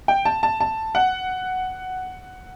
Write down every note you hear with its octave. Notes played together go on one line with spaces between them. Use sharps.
G5
A5
A5
A5
F#5